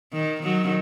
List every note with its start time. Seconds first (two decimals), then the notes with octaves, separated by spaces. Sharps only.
0.13 D#3
0.43 D#3 F#3